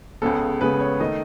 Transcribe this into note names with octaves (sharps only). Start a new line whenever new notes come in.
C#2 C#3 G#3 B3 A4
C#2 C#3 G#3 B3 B4
C#5
D#3 A3 D#5